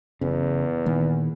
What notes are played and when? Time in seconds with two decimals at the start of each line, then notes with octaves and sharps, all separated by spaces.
0.21 F#1 E2 C#3
0.86 A#2 D#3 A#3